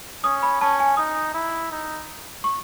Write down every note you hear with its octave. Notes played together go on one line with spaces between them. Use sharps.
C#4 D#6
B5
C#4 A5
G#5
D#4 D#6
E4
D#4
C#6